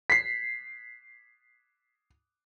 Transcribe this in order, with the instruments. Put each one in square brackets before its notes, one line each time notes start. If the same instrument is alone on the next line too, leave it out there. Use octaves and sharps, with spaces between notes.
[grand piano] B6 C7